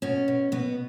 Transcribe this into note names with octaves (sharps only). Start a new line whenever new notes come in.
B2 C#4
B2
B2 B3